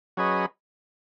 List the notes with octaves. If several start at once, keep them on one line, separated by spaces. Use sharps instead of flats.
F#3 C#4 G#4 B4 D#5